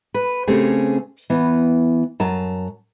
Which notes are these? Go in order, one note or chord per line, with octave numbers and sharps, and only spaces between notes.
B4
C#3 A3 C4 C#4 G4 G#4
E3 B3
F#2 A5 A#5